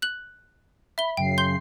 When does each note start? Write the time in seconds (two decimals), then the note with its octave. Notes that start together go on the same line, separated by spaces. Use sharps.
0.02 F#6 F#7
0.98 E5 B5 G7
1.17 F#2 C#3 G5 C7
1.38 C6 G6 G7